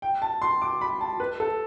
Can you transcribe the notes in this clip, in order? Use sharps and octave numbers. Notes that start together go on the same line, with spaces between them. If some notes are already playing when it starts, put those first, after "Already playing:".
G5
A5
C6
D6
B5
A5
B4
A4